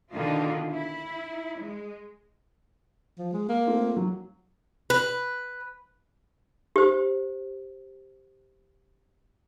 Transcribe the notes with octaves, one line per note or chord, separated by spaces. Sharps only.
B2 D3 D#3 A#3 D#4 F4
E4
G#3
F3
G#3
A#3
A3 C4 F4
F#3
B4
G4 C5